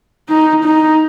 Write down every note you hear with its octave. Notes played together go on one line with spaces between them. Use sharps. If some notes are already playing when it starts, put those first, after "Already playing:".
D#4
D#4